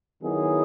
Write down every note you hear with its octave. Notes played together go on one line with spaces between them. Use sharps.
D#3 F#3 B3 E4 G#4